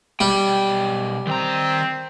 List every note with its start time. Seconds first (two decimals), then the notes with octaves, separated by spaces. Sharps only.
0.21 B1 G3 G5
1.27 D#3 C4 A#5